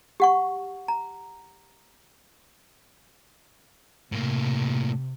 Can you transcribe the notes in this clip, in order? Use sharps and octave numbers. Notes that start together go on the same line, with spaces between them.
G4 F#5 C#6
A#5
A2 C3 A#3